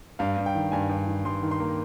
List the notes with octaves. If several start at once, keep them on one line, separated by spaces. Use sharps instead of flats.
G2 F5
G2
G5
D#3
G2 G#5
G2
D#3
G2 C6
D#3
C6
A#3